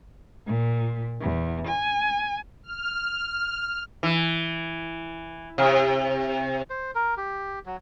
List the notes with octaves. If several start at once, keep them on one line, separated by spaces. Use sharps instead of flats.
A#2
E2
G#5
F6
E3
C3
C5
A#4
G4
F#3